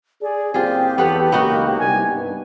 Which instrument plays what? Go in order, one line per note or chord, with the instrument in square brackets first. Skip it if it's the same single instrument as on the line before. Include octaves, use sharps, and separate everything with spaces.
[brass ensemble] G#4 [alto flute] D5
[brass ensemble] F#1 C4 [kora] F4 G#4 [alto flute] G4
[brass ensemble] E2 A4 [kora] B3 B4 C#5
[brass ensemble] C#2 A#3 [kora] B3 D#4 F#4
[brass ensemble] C2 G#5
G2